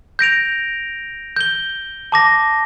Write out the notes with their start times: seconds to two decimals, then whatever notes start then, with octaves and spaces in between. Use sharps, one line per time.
0.19 G6 A#6 D7 F7
1.36 G6 G7
2.12 A5 D6 A#6